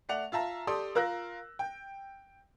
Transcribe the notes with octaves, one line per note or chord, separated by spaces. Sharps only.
A3 D5 F#5 F7
F4 E5 A5 A#5
G4 A4 D5 C6 D#6
F4 A#4 E6 F#6 A#6
G5